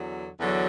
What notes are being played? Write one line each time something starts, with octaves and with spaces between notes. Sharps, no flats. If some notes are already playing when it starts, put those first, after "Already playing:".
Already playing: E2 D3 F#3
E2 D3 F#3